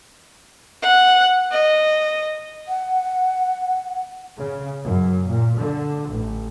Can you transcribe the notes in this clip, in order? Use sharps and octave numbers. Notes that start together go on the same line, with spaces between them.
F#5
D#5
F#5
C#3
F#2
A#2
D3
A1